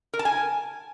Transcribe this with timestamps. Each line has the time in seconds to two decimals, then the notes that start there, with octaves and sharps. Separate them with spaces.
0.13 A#4
0.19 A5
0.25 G#5